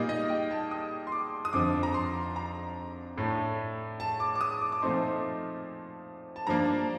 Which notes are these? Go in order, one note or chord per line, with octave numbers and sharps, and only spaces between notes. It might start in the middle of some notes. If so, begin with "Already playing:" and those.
Already playing: A#2 G3 A#3 D#4
D#5
G5
A5
D#6
C6
D6
D#6
F2 D3 F3 D6
A#5
C6
A#5
A2 A3 D4
A5
D6
D6
D#6
D6
D6
A#2 F3 A3 C4 D#4 C6
A5
G2 F3 A#3 D4 A#5